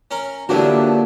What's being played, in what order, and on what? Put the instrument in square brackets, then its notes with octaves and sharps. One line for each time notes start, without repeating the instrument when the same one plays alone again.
[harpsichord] C#4 A#4
[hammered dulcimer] A#2 [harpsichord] D3 B3 E4 [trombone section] D4 [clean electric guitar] F#4 G4 C#5